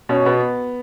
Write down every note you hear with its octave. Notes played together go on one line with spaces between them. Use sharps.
B2 C#4
B2 B3